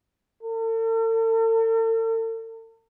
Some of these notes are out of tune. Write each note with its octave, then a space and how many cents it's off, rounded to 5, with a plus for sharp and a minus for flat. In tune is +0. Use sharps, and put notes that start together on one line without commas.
A4 +45